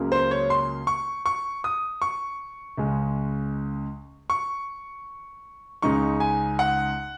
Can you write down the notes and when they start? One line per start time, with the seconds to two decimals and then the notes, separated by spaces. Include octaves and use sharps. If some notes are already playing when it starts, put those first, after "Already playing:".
Already playing: C#2 C#3 F#3 A#3
0.12 C5
0.31 C#5
0.50 C6
0.87 C#6
1.26 C#6
1.64 D#6
2.02 C#6
2.78 C#2 C#3 G#3
4.30 C#6
5.82 C#2 C#3 G#3 D#4 C#6
6.20 G#5
6.59 F#5